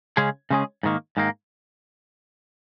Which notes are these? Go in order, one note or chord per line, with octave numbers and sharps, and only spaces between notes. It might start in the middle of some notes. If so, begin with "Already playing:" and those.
C#3 G#3 C#4 G#4
C#3 G#3 C#4 G#4
G#2 D#3 A#3
G#2 D#3 A#3